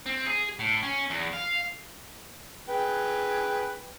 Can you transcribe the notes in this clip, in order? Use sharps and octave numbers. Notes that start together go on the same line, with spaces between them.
C4
G#4
A2
C#4
E2
F5
G#4 B4 G5